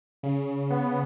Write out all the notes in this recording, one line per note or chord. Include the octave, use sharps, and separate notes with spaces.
C#3
B3